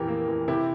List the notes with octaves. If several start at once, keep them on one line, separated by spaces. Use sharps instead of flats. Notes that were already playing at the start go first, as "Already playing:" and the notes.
Already playing: F2 A#2 E3 G4 A#4
A#3
E3
C3 E4 G4